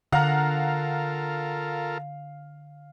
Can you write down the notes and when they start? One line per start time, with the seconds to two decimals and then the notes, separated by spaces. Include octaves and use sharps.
0.12 D3 F4 A4 A#4 F5 F#5 A#5